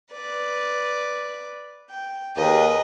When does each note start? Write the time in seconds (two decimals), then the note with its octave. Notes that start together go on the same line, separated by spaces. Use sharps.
0.11 B4 D5
1.90 G5
2.36 D#2 G#4 B4 D#5